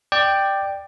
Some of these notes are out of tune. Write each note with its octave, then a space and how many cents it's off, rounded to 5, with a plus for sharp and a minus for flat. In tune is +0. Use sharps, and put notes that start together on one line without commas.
D5 +15 G5 +0